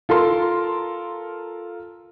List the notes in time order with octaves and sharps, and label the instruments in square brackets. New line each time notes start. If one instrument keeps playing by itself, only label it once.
[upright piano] F4 A4 A#4 C6